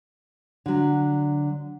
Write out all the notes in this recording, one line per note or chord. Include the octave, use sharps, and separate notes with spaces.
D3 F#3